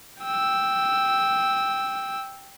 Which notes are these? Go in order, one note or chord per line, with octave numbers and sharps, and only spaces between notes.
G5 E6